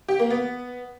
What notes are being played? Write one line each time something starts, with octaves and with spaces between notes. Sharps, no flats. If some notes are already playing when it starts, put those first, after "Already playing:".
G4
A#3
B3